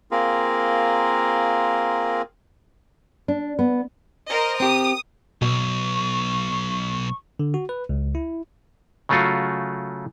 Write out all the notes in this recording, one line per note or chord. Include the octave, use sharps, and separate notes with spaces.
A#3 C4 F4 G#4 A#4
D4
B3
A#4 C5 D#5
C4 G4 D#6
B1 B2 C#6
D3
F#4
B4
C#2
E4
C#3 F#3 A3 F4 F#4